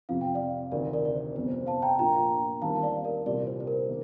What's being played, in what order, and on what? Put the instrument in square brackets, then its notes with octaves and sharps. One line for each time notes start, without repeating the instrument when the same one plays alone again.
[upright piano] F2 C3 F3 [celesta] F5
[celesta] G5
D5 F5
[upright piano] D2 C3 D#3 [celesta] A#4 D5
[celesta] A#4 D5
D5
C5
[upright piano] G1 F2 C3 [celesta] C5
[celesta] C5
F5 A5
G5 A#5
[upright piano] A#2 F3 A#3 D4 F4 [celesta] G5 A#5
[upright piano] D#2 D#3 G3 C4 [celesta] F5 A5
[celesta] D5 F5
A#4 D5
[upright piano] C2 A#2 G3 C4 G4 [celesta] A#4 D5
[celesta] C5
C5
A#4
[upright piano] D#3 A#3